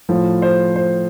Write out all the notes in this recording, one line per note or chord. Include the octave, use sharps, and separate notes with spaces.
A2 F3
C5
C5